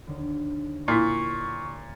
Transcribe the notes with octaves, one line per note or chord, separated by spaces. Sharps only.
D#2 D3
A#2 E4 C6 C#6